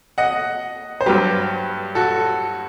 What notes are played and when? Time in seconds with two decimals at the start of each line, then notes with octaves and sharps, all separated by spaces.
0.18 D#5 F#5
1.01 C5
1.06 G2 F#3 G4 B4
1.95 F#4 A4